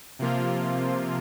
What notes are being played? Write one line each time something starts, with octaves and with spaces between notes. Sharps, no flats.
C3 F3 A#3 F4